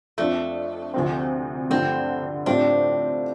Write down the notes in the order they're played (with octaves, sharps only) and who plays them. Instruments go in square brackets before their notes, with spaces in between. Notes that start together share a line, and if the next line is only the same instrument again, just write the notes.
[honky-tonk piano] F2 F3 D4 F4 [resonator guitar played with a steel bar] A3
[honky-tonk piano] D2 C3 F3 C4
[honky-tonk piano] G2 D3 F3 A3 [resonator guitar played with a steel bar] C4
[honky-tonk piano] A2 G3 C4 F4 [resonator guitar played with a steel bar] D4